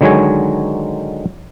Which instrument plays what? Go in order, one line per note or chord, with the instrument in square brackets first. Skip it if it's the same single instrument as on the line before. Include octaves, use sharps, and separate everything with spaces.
[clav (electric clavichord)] D3 D#3 F#3 G#3 C#5 G#5